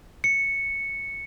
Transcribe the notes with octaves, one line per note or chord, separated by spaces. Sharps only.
C#7